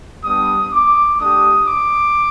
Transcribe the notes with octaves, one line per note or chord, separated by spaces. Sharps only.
G3 B3 D4 D#6
D6
A3 D4 G4 D#6
D6